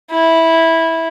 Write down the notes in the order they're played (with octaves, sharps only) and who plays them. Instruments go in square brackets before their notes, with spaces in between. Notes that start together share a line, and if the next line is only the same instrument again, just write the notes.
[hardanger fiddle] E4